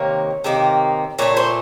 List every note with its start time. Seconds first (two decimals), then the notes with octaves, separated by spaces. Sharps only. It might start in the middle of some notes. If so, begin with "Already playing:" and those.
Already playing: C3 D#3 A#3 C#5
0.44 C3 D#3 A#3
1.19 A#2 A3 C#5
1.37 C5